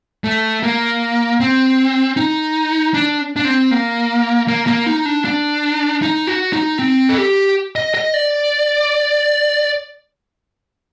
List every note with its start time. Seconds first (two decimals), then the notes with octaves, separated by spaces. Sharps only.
0.24 A3
0.63 A#3
1.40 C4
2.17 D#4
2.94 D4
3.36 D4
3.45 C4
3.71 A#3
4.48 A#3
4.67 A#3
4.86 D#4
5.05 D4
5.25 D4
6.02 D#4
6.27 F#4
6.53 D#4
6.79 C4
7.09 A4
7.18 G4
7.76 D#5
7.94 D#5
8.14 D5